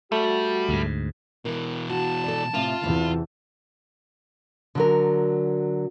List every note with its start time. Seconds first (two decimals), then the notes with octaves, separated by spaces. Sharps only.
0.12 G3 A3 F#4
0.68 D2 G#2
1.45 B2 E3 A#4
1.90 F#4 A5
2.24 A4 D5
2.54 A2 C3 F4
2.84 E2 C3 E4
4.75 D3 F#3 A#4